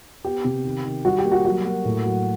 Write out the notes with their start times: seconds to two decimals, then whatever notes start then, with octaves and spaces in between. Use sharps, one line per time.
0.25 B3 G4
0.44 C3
0.64 D#3
0.85 D#3
1.05 G3 F#4
1.18 G4
1.25 A#3
1.32 F#4
1.45 F#3 F#4
1.65 A#3
1.85 A2
2.05 F#3